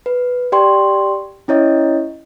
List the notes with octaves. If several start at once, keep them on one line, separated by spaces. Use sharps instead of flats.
B4
G4 D5 G5 C6
C#4 E4 C#5 D#5